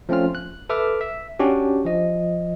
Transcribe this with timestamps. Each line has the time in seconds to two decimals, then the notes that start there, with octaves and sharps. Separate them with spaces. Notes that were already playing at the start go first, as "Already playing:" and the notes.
0.09 F3 A3 C4 C#4 F4 F6
0.35 F#6
0.69 A4 B4 E5 D6 F6
1.01 E5
1.39 C#4 D4 F#4 G4
1.85 F3 D#5